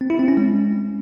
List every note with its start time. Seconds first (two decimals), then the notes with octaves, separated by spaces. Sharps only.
0.01 C4
0.10 E4
0.19 C4
0.28 C#4
0.37 G#3